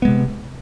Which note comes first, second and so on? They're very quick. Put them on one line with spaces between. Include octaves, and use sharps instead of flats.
B3 G#3 C3